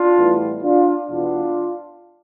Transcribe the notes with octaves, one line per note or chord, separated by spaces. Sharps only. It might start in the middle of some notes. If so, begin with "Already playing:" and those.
Already playing: D4 F4
A2 E3 G3 B3
D4 F4
E2 B2 B3 D4 F4